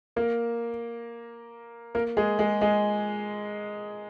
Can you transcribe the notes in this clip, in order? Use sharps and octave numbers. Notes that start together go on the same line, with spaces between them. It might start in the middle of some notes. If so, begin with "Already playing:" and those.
A#3 A#4
A#3 A#4
G#3 G#4
G#3 G#4
G#3 G#4